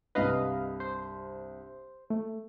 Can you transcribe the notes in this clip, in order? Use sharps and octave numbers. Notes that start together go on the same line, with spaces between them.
C2 G2 B4 D#5 F5
C5
A3